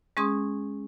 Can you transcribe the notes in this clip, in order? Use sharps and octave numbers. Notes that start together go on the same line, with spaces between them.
G#3 C#4 G#4 C6 D#6